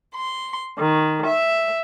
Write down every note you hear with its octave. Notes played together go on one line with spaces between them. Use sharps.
C6
D#3
E5